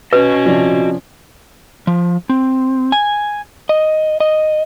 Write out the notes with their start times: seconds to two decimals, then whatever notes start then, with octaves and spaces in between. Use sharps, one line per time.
0.13 C#4 F#4 B4 D#5
0.45 C3 F3 D5
1.87 F3
2.29 C4
2.92 G#5
3.69 D#5
4.20 D#5